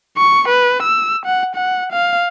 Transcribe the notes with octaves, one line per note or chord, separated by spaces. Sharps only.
C#6
B4
E6
F#5
F#5
F5